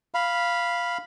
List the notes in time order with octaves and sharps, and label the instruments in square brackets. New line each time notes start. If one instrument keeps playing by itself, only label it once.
[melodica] F5 B5